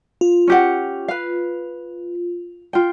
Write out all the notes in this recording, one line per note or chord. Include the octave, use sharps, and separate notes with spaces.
F4
C#4 G4 F#5
B4 F5
F4 G5